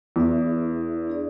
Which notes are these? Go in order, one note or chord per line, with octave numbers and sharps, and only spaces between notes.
E2 E4 G#4 B4 E5
D4 G#4 D5